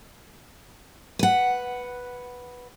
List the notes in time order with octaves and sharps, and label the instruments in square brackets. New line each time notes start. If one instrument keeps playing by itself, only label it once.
[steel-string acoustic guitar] B4 F#5